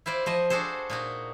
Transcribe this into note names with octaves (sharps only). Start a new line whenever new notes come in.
E4 F4 C5 D5
F3 C5 D#5
D4 F#4 G#4 A4 C5
A#2 D#4 F#4